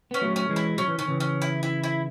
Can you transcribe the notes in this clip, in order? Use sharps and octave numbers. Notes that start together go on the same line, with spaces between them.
B3 C#4
F#3 A3
C#4
E3 G#3
E4
F#3 C#4
E3
D#3 C#4
C#3 E3
C#4
E4
E4
E4